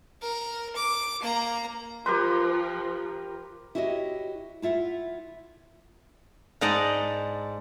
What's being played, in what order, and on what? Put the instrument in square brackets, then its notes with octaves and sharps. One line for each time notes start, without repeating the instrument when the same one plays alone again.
[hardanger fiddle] A#4
D6
A#3 A#5
[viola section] F3 [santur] G4 A#4 B4 [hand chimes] C6
[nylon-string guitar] E4 F#4 G4 C#5 D#5
E4 F4 E5 F#5
[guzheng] G#2 D5 D#5 F#5 A5